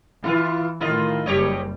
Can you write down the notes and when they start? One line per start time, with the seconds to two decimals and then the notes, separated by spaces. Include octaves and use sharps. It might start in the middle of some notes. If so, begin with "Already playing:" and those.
0.24 E3 E4 F4
0.81 A2 D#3 E4 F4 D#5
1.26 F#1 G3 G4 C#5 D#5